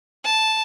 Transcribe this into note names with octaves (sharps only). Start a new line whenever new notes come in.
A5